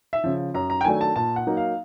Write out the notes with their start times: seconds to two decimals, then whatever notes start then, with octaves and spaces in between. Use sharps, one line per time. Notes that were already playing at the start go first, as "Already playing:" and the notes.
0.13 E5
0.24 C#3 F3
0.54 F#2 A#5
0.70 A#5
0.81 G5
0.85 D#3 F#3 A3 D4 G#5
1.01 A5
1.16 A#2 A5
1.36 F#5
1.47 F#3 A#3 D#4
1.57 F5